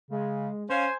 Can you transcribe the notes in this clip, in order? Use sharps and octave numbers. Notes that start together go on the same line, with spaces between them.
C#3 G#3
C#4 C5 F5 G#5